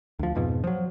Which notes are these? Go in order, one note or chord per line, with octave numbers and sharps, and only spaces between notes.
D2 F3
F2 G#2 B2 F3
F3 F#3